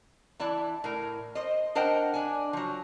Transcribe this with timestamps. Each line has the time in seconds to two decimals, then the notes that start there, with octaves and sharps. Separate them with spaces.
0.40 E3 E4 D5 A5
0.84 A2 A#4
1.35 C5 D#5
1.75 D4 A#4 C5 D#5 F#5 G5
2.14 D4 G#5
2.53 F3 F#3